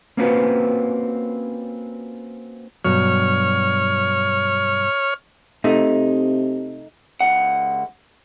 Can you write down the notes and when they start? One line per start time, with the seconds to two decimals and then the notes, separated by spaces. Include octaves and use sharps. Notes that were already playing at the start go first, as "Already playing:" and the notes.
0.17 A#3 C4 C#4 F4 F#4 B4
2.85 G2 B2 F#3 C#5 F6
5.64 C3 A3 D#4
7.20 C#2 F#5